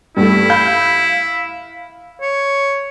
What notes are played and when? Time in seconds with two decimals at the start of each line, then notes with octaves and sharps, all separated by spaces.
0.17 G2 A3 E4
0.50 F5 B5 G6
2.22 C#5